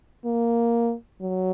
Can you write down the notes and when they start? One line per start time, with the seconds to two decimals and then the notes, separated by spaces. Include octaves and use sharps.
0.25 A#3
1.22 F#3